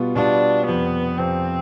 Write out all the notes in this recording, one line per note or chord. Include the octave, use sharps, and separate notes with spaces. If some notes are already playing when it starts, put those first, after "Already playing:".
Already playing: B2 G3 B3 F4
B2 G3 B3 D4 F4
F2 C3 F3 B3
F2 C3 F3 C4